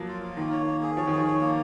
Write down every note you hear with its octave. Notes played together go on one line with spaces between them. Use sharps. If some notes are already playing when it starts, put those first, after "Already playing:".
Already playing: F3 F#3 A#3
F4
F4
D#3 A#3
C#5
A#3
G#4
F3 C#5
D#3 G#4
F3
C#5
A#3